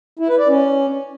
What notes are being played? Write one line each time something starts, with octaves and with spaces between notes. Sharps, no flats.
E4
B4
D5
C#4